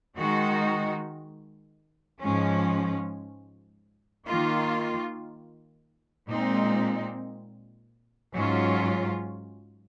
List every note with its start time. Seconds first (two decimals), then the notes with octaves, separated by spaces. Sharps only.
0.17 D#3 G#3 D#4 F#4
2.20 G#2 F3 G#3 C#4
4.26 D#3 A#3 F4
6.29 A#2 G#3 C4 D#4
8.34 G#2 F#3 C#4 F4